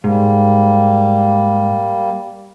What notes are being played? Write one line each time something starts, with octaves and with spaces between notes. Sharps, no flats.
G#2 G3 A#3